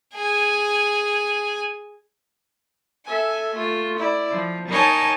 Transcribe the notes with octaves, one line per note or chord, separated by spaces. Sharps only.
G#4 G#5
A4 E5 G#5
A3 F4
E4 D5
F3
D#4 A#4 C#5 D#5 G#5 A5